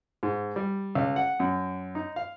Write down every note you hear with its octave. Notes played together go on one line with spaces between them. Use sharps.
G#2
G3
C#2
F#5
F#2
D#4
F5